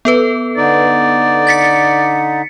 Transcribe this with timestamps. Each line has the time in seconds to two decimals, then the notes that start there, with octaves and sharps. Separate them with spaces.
0.05 B3 A4 B4
0.57 D3 D#4 D5
1.47 A6 B6 C#7